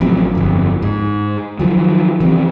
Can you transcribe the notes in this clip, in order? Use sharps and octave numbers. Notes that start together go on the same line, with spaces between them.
A1 C3 F3 F#3
G1 F2
G#2
D#3 F3 F#3
E3 F3 G3 C4